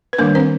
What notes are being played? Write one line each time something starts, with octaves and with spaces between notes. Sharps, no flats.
B4
D#3 G3 A#3 D4 A#4
C4 C5